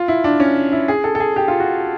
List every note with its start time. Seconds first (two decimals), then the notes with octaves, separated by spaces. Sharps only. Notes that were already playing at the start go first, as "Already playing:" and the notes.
Already playing: F4
0.08 E4
0.24 D4
0.40 C#4
0.72 E4
0.88 G#4
1.04 A4
1.15 A4
1.20 G#4
1.36 G4
1.48 F4
1.60 F#4